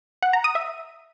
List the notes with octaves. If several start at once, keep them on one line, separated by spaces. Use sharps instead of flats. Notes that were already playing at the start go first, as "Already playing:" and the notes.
F#5
A#5
D#6
E5